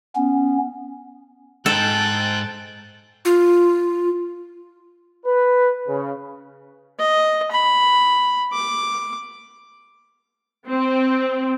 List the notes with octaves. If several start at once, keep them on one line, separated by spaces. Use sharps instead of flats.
B3 C#4
G#2 A4 G5 F#6 A6
F4
B4
C#3
D#5
B5
D6
C4